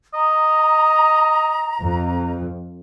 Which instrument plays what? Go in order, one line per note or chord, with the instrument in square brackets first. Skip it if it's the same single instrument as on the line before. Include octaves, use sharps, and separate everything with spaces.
[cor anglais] D#5 [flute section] A#5
[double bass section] F2